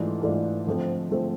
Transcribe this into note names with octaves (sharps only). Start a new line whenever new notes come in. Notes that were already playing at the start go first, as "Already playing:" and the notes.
Already playing: G#2 E3 A3 D4 F4
G#2 E3 A3 D4 F4
D3 F3 A3 C4
D3 F3 A3 C4